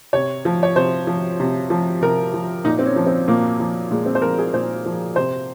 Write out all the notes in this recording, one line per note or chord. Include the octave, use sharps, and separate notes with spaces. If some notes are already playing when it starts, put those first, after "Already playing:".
C3 C#5
F3
C#5
C3 C5
F3
C3
F3
C3 A#4
F3
A#2 D#4
C4
C#4
F3
C4
A#2 A#3
F3
A#2 G#3
C4
C5
F3 A#4
G#4
A#2 C5
F3
C3 C5